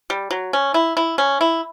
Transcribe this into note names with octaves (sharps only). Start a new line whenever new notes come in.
G3
F#3
C#4
E4
E4
C#4
E4